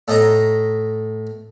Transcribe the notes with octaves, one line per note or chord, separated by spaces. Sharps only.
A2 D#5 A#5